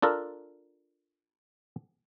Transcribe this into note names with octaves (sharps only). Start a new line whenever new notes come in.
D4 F4 A4 A#4